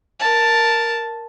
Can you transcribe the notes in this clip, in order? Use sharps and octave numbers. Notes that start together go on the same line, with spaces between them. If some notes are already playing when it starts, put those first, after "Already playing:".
A#4 A5